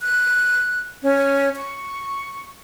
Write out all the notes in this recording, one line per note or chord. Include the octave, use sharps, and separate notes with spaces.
F#6
C#4
C#6